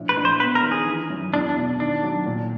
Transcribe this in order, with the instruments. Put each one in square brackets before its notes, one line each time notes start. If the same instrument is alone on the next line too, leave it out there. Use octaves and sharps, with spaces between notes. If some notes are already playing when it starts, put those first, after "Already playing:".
Already playing: [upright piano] A#1 A2
[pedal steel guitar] B4
[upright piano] A#1
[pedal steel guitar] C5
[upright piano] B3 [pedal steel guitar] B4
[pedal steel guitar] A#4
[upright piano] D#3
[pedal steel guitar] G#4
[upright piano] E3
F#2
[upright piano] E2 [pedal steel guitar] D4
[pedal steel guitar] D4
[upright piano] B2
[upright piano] D#3 [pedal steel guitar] D4
[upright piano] F#3
A#2